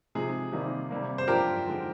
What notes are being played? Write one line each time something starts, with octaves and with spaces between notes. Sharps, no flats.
C3 F3 G#3 D#4 G#4
C3 D#3 G3 A#3 D#4
C3 G3 A#3
C5
G2 F3 A#3 D4 F4 G4 A#4
D3 F3 G#3 D#4